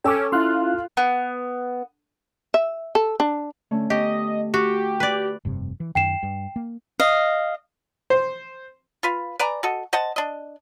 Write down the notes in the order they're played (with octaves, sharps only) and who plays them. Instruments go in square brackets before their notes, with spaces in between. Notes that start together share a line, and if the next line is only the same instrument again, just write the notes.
[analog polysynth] C#4 [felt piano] A4 E6 [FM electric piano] G5 D6
[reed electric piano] C#4 E4 [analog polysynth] F4 [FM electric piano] C6 F6 F#6
[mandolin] B3
[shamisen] E5
A4
D4
[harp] D3 A3 C#4
[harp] D3 B3 C#6 [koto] G4 [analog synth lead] D#5
[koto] F#4 [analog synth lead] G4
[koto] B4 D5
[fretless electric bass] F1 G2 C3
E3
[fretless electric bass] F#2 D#3 [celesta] G5 C7 E7
[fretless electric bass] G2
A#3
[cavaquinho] D#5 F5
[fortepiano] C5
[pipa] F4 B4 F5
B4 D5 G#5 A#5
F#4 A4 D#5
C5 D#5 F#5 A5
D4 D#5